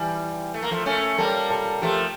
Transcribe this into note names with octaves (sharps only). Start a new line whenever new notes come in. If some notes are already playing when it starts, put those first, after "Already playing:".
Already playing: E3 G3 G5 A5
A3
A#3
F3 A3
A3 C#4
G3 A#3 A4 A5
A4 A5
F3 A3 G4 G5